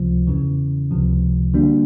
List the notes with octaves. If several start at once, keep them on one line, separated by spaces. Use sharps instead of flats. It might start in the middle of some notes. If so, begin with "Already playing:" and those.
Already playing: C#2 C3 F3
E2 C#3 E3
C#2 C3 F3
D3 G3 A#3 D4 F#4